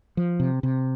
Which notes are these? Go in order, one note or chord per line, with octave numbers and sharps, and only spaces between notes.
F3
C3
C3